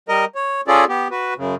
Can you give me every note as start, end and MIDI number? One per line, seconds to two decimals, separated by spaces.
0.09 0.25 55
0.09 0.25 70
0.09 0.25 75
0.35 0.61 73
0.68 0.85 61
0.68 0.85 65
0.68 0.85 68
0.68 0.85 69
0.68 0.85 74
0.89 1.08 59
0.89 1.08 67
1.11 1.34 66
1.11 1.34 71
1.38 1.55 42
1.38 1.55 49